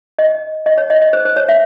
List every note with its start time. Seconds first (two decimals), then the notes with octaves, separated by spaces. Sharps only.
0.19 D#5
0.66 D#5
0.78 C#5
0.90 D#5
1.02 D#5
1.13 C5
1.25 C5
1.36 C#5
1.49 E5